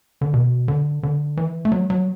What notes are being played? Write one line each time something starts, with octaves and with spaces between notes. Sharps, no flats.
D3
B2
D3
D3
E3
A3
F#3
F#3